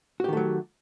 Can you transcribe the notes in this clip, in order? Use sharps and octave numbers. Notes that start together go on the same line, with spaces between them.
D#3 F#3 A3 F#4 G4